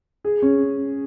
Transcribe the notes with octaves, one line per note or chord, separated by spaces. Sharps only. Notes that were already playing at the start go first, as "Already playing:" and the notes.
G#4
C#4